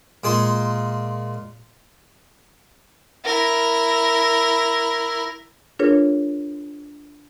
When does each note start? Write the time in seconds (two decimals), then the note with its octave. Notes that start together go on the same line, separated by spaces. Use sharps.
0.24 A#2 G#3 G#4 C6
3.25 E4 A#4
5.79 D4 F4 G#4 A#4 B4 C#5